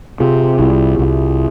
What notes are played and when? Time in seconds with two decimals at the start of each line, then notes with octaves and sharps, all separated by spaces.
0.20 C3 F4 G#4
0.59 C2 E4 G4
0.99 C2